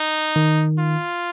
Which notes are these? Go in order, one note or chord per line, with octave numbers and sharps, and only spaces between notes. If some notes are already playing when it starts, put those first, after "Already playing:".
Already playing: D#4
D#3
F4